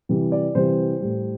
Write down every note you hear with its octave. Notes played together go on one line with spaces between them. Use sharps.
C3 E3 G3
D5
C3 E3 G3 C5
A2 G3